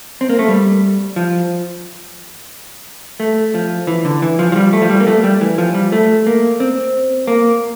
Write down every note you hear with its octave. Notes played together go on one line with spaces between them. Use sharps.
C4
A#3
A3
G3
F3
A3
F3
E3
D3
E3
F3
F3
G3
A3
F3
G3
A#3
A3
G3
E3
F3
G3
A3
A#3
C4
A#3